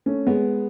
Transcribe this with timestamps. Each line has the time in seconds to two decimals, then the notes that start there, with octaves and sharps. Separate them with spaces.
0.06 A3 C#4
0.27 G#3 B3